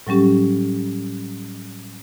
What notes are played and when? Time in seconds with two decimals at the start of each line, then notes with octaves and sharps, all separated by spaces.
0.07 A2 F#3 G3 C#4 G4